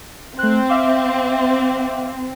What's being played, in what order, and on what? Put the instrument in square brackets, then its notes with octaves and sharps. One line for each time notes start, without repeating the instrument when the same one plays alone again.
[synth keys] A3 F#6 [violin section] C4
[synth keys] E5 F5 D6